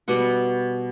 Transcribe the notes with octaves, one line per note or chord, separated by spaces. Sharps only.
B2 G3 F#5